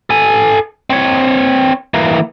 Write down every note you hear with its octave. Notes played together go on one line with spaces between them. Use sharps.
A4 G#5
C4 C#5
E3 A#3